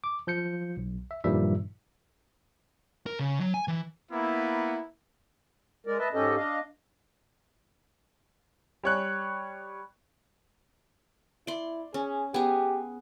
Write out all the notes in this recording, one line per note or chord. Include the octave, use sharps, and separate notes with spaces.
D6
F3 G6 C#7
B1
E5
G2 A#2 D#3 F3 G3 E5
A#4
C#3
F#3
G#5
E3
A#3 B3 E4
G#3 A#4 D5
B4 D#5 E5 A5
G#2 C#4 G4 A4 D#5
D4 D#5 F5
G3 C#5 F#6
E4 D5 C6
C#4 G#4
B3 G4 G#4